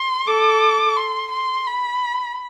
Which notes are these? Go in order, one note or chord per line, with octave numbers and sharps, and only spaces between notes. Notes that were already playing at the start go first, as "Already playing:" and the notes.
Already playing: C6
A4 D6
C6
C6
B5